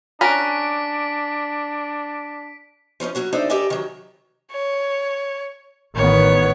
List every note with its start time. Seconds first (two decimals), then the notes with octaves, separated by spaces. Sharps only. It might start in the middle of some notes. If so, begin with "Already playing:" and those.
0.21 C#4 D4 F#4 A#4 B6 D7
3.00 F3 G3 C#4 D#4
3.15 F#3 C#4 F#4 C#5
3.33 D4 D#4 A4 C5 D5 E5
3.49 G4 A4 A#4 D5 D#5 G#5
3.70 D#3 F#3
4.51 C#5
5.96 A1 D#3 B3 C#5